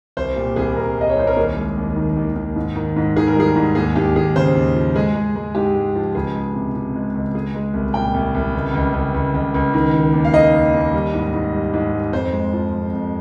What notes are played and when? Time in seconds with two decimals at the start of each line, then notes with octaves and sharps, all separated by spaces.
0.17 C2 C5
0.36 A#2 G4
0.56 C2 G#4
0.76 C2 A#4
0.97 C2 D#5
1.09 C#5
1.17 C2 C5
1.27 A#4
1.36 D#2 G#4
1.56 G#3
1.77 D#2
1.96 D#3
2.17 D#2
2.36 D#2
2.56 G#2
2.75 D#3
2.96 G#2
3.16 D#3 G#4
3.28 A#4
3.35 G3 G#4
3.55 G#2
3.75 D#2 G#4
3.96 D#2 G4
4.16 D#2 G#4
4.36 C#3 C5
4.55 D#2
4.75 F3
4.96 G#3 G#4
5.15 G#3
5.36 G#3
5.55 G#2 G4
5.74 G#3
5.95 F3
6.15 C#2 G#4
6.35 G#3
6.54 C3
6.75 C3
6.95 G#3
7.15 C#2
7.34 G#3 G#4
7.54 G#3
7.74 C2
7.94 A#2 G5
8.14 C2
8.35 C2
8.55 C#2
8.74 C#2
8.93 C#2
9.14 C#2
9.34 C#2
9.54 C#2
9.74 D#3
9.94 D#3
10.13 D#2
10.25 F5
10.33 D#3 D#5
10.53 D#2
10.74 D#2
10.93 G3
11.14 G#2
11.34 G#2
11.53 G3
11.74 G#2
11.93 G3
12.12 F2 C5
12.32 G#3
12.53 F3
12.73 F2
12.93 F2